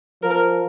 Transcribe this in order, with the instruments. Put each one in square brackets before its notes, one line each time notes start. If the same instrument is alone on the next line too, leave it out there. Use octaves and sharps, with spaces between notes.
[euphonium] F3 [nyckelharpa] A#4